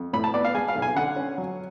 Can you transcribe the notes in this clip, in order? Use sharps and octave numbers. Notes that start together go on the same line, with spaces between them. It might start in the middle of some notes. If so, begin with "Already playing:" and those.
Already playing: F2
A2 B5
A5
B3 D5
F5
G#3 G#5
F5
B1
G#5
D3 F#5
C#4
F#3